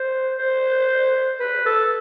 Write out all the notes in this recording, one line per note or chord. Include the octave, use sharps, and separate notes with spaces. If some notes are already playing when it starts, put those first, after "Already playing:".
Already playing: C5
C5
B4
A4